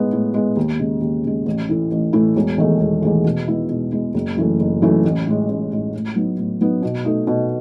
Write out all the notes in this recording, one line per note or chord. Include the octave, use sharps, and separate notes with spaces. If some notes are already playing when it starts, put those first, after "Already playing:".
Already playing: A2 G#3 B3
A2
G#3 B3
D#2
C#3 G#3
D#2
C#3 G#3
A1
A2 E3 A3 E4
A1
A2 E3 A3 E4
E1
E2 D#3 A3
E1
E2 D#3 A3
B2
G#3 B3 E4
B2
G#3 B3 E4
F#1
F#2 E3 A3
F#1
F#2 E3 A3
A1
A2 G#3
A1
A2 G#3
A2
F#3 B3 D#4
A2
F#3 B3 D#4
B2
A3 D#4
B2